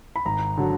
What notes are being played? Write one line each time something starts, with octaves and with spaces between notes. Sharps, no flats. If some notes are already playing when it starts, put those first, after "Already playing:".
B5
G#1 A#5
D3 F#3